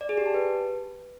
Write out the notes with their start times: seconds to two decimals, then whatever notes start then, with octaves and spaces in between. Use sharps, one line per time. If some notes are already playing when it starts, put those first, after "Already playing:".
0.01 D5
0.09 G#4
0.17 G4
0.26 A5
0.34 B4